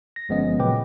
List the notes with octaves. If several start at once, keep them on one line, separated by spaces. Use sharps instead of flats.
A#6
G1 F3 G#3 B3 C#4 D#5
A#2 C#3 F#3 B4 G5 D6